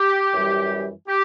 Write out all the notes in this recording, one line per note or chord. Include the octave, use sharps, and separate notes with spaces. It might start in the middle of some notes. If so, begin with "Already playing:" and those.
Already playing: G4
F#2 E3 G3
G4